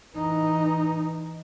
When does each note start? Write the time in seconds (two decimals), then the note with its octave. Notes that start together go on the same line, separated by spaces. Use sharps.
0.15 E3 D#4